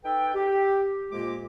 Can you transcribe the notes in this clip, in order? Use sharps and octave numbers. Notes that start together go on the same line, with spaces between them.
D#4 A4 B4 G5
G4
F2 A#2 G#3 A#3 G4 D6